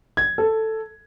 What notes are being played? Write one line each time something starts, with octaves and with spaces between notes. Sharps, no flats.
G#6
A4